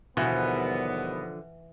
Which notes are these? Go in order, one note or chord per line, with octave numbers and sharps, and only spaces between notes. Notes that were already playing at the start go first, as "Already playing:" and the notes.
D#2 B2 D3 E3 F3 G3 B3